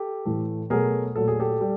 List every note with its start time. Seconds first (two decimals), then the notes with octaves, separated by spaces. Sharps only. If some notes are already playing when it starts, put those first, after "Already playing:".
Already playing: G4 A4
0.25 A2 E3 A3
0.70 B2 F#3 A3 G#4 A#4
1.16 A#2 F#3 A3 A4
1.28 G#4
1.40 G4 A4
1.61 G3